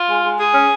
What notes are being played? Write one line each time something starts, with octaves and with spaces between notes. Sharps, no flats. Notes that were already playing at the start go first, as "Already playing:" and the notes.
Already playing: F4
G#3
G#3
G#4
C#4